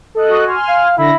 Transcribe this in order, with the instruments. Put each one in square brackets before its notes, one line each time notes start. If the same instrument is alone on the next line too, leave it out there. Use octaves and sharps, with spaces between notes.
[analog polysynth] A4 D#5 F#6
[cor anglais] F#4
[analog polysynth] G#5 C6 F6
[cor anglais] F5
[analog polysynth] D3 A#6 [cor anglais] E4